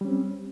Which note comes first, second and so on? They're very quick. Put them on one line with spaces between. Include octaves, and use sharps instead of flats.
G3 C#4 C4